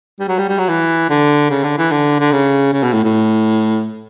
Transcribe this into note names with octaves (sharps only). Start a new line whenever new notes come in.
G3
F#3
G3
G3
F#3
E3
D3
C#3
D3
E3
D3
D3
C#3
C#3
B2
A2
A2